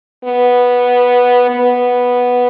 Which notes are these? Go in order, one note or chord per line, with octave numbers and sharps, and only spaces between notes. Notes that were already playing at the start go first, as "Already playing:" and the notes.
B3
B3